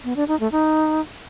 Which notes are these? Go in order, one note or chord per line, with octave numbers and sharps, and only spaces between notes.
B3
D4
D#4
A3
D#4